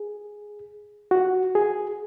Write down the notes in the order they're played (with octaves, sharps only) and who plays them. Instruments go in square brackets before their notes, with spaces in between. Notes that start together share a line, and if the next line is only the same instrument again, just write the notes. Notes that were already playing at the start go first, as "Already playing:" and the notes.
Already playing: [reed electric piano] G#4
F#4
G#4